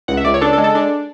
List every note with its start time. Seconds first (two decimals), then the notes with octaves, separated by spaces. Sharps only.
0.08 C#2 F#5
0.17 E5
0.25 C#2 D5
0.34 C#5
0.41 D4 A4
0.53 A4
0.58 G#3
0.64 A4
0.75 D4